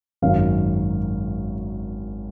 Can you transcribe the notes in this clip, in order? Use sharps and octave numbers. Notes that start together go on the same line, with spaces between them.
G#1 F#2 D#3 F5